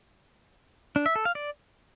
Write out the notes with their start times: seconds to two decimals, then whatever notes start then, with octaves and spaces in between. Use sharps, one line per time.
0.96 D4
1.06 E5
1.16 A4
1.25 F5
1.35 D5